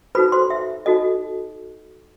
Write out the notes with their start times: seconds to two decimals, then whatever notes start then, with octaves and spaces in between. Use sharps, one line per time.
0.15 D#4 F#4 A4 B4 C5 B5
0.32 C5 C6
0.50 E5
0.86 D#4 F#4 A4 C5 D#5